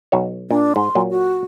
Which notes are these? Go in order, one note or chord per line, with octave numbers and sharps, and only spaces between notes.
B1 F#4 C#5
A#2 D4
G#2 C6
A#2 F#3
F#4